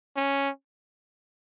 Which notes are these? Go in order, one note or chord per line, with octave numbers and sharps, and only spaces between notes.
C#4